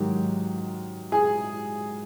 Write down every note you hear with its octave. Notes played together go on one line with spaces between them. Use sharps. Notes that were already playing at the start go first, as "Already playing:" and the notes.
Already playing: G#2 D#3 F#3 G4
G#4